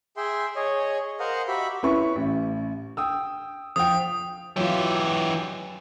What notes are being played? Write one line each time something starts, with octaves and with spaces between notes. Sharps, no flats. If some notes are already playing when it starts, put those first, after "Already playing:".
G#4 E5 G5 C6
G#4 C#5 D#5
A#4 C5 D#5 F5 F#5
F#4 G4 E5 B5
C#4 E4 B4 B5 C#6
A1
G5 D#6 E6
F3 G5 D#6
E3 F#3 F4 G4